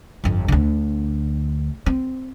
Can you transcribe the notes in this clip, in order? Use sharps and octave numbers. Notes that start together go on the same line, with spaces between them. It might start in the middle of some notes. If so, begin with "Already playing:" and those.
G1 F2
D2 D3
C4